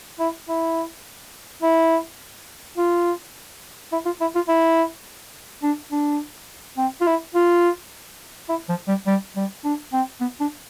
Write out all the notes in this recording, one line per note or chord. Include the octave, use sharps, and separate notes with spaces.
E4
E4
E4
F4
E4
F4
E4
F4
E4
D4
D4
C4
F4
E4
F4
E4
F3
G3
G3
G3
D4
C4
B3
D4